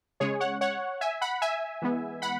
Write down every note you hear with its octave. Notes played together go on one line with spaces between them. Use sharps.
C#3 G#3 C#4 G#4 C#5
C#5 F#5
C#5 F#5
E5 G#5
F#5 B5
E5 G#5
E3 G#3 B3
F#5 B5